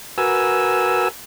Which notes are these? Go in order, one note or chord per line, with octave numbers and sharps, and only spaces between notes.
F#4 A#4 B4 G#5 E6